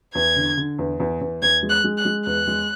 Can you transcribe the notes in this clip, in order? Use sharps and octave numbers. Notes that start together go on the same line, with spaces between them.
E2 G#6
D3
D3
E2
E2
E2
E2 G#6
G#3
F#6
G#3
F#6
G#3
E2 F#6
G#3